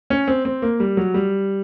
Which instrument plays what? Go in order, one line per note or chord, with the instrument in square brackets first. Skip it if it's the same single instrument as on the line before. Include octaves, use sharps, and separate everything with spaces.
[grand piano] C#4
C4
C4
A#3
G3
F#3
G3